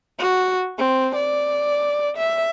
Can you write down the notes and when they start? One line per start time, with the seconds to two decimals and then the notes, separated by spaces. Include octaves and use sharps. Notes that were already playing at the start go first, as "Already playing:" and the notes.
0.19 F#4
0.78 C4
1.15 D5
2.17 E5